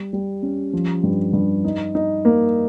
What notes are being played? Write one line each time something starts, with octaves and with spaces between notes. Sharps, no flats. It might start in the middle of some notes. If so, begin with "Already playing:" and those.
Already playing: G3
G3
C#4
F3
G2
G2
D#4
D#4
A#3